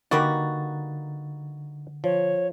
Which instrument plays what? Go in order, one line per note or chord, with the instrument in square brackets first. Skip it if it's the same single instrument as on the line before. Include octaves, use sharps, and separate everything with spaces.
[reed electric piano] D3 A6 [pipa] G3 A#3 F#4 [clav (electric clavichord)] D#4 B4 F#5
[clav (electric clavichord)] F3 [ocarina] C#5